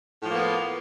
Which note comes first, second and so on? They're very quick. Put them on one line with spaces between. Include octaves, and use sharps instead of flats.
A2 F3 A#3 B3